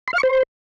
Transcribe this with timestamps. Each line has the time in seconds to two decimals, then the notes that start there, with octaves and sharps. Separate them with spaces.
0.08 C6
0.13 F5
0.18 C#6
0.23 C5